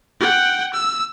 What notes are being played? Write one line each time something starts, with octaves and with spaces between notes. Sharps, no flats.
F#5 G5
E6